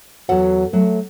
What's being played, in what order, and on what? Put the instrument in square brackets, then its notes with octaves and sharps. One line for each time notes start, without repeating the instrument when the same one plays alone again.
[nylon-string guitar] E2 A4 F#5 [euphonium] F#3
[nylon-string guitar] F#3 [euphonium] A3